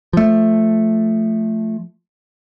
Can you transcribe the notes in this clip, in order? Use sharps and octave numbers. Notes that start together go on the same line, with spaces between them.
F3 A3